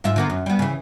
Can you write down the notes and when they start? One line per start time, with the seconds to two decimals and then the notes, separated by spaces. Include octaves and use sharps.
0.04 G#2 F4 E5
0.16 D3 A#3 B3
0.30 F#2
0.46 G3 B3
0.59 C#3 E3